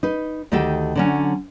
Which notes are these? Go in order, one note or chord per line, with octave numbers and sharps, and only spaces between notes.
D#4 B4
D2 D#3 D#4 G4 A4 G5
D3 F#3 C#4